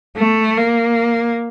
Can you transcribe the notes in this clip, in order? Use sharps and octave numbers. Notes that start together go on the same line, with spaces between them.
A3
A#3